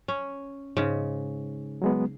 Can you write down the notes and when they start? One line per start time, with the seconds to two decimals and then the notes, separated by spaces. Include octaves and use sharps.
0.08 C#4
0.77 G#2 C#3
1.82 F#3 G#3 B3